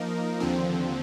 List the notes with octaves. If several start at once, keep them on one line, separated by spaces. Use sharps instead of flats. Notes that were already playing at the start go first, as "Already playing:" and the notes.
Already playing: F3 A#3 D#4 A#4
D#2 D3 F3 C4